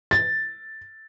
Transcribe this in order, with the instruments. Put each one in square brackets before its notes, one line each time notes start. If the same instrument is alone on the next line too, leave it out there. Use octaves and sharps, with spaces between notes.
[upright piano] A6